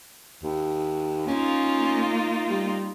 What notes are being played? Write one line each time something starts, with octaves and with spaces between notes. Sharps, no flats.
D#2
A#3 C#4 D#4 F4
G3